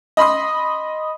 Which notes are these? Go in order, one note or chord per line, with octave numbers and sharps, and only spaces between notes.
D#5 B5 C6 D#6